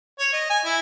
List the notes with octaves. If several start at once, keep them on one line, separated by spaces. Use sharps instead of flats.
C#5
D#5
G#5
E4